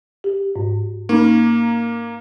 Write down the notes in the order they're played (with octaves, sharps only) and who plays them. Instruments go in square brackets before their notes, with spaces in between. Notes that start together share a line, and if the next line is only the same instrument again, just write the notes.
[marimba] G4
G#2
[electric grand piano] A#3 [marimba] C#4 D#4